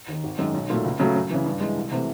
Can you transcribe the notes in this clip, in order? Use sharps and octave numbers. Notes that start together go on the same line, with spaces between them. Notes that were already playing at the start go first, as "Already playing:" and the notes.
D#2 D#3
G#1
F#2 D#3 G#3
B1
A#2 F#3 A3
C#2
C#3 F#3 A3
F#2
C#3 E3
G2
E3 G#3
C2
C3 E3 A3